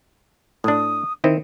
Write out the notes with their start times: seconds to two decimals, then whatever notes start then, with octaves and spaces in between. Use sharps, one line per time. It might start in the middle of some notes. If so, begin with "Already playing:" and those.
0.64 A2 D4 D#6
1.24 D#3 C4 E4 D#5